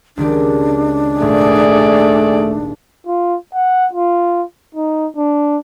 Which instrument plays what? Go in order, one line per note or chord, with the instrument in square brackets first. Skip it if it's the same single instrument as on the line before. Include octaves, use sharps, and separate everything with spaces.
[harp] C#2 D#3 G4 [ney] D4
[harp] D#1 G#1 [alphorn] A3 [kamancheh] G#4 D5
[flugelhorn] F4
F#5
F4
D#4
D4